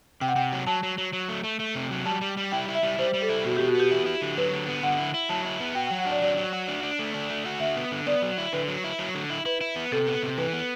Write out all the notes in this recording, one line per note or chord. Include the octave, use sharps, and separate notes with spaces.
C3 G5
F#5
C3 G5
F#3
F#3 A5
F#3
F#3
F#3
A3
A3
A3
C3
F#3
G3 A5
G3
G3
E4 G5
E4
E5
G3
G3 C5
G3
A4
E4
B2 F#4
B2 G4
F#4
B3 G4
E4
E4
D3
F#3 B4
D3
B3
D3 F#5
E4
E4
F#3 A5
E4
B3
F#4 G5
G5
F#3
F#5
D4 D5
F#3 D5
F#3
F#4
D4
D4
A3
D4
A3
F#4
D3 E5
B3
D3
B3 D5
F#3
E4
D3 B4
F#3
E4
F#3
D3
E4
E4 B4
E4
B3
C3 A4
B3
C3
E3 B4
B3